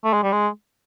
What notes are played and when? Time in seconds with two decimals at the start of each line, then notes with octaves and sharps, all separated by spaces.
0.04 A3
0.13 G#3
0.23 G3
0.32 G#3